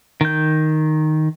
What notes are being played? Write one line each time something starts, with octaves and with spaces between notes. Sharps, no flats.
D#3 G6